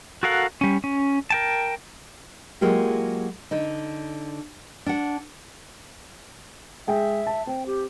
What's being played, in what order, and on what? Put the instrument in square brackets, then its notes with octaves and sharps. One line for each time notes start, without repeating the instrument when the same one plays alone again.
[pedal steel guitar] F#4 A4 A#4 F5 F#5
G3 C#4
C#4
A#4 G5 A5
[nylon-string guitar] F#3 G#3 A#3 F4 G4
D3 D#4
D4 F#5
[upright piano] G#3 G#4 G5 [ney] E5
[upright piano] A5
[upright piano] C4 [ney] G5
[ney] G4